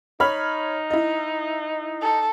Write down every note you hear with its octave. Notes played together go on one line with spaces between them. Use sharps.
D#4 C#5 B5 F6
E4 D#5
A4